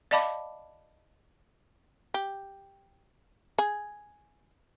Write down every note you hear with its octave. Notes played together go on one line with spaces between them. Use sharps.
D5 D#5 F5 A5 B5 D6
G4
G#4